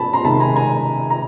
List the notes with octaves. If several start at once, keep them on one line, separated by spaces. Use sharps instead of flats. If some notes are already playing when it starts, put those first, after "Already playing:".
Already playing: A5 B5
A#5 C6
C3 D#3 G#3 A5 B5
G#5 A#5
G#5 A#5
A#5